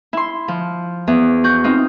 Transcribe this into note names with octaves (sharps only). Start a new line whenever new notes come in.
E4 C6
F3
E2
F#4 G6
C4 D#4 F4